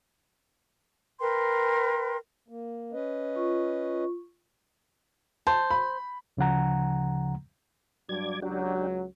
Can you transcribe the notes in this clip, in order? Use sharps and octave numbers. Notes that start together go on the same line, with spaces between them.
A#4 B4 G5 C6
A#3
C#4 B4 D#5
F4 C#6
C5 A5
B5
D2 C#3 F3 F#5 A#5
G2 F#3 D5 G#6
C#2 F#3 D4 F#4 G4